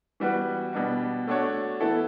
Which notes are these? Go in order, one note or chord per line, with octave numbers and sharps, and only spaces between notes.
E3 G3 B3 F#4 B4
B2 G3 D4 F#4
A3 D4 F#4 C#5
E3 B3 E4 A4